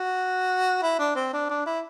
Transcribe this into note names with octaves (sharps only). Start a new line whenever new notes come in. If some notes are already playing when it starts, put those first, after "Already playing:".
Already playing: F#4
E4
D4
C4
D4
D4
E4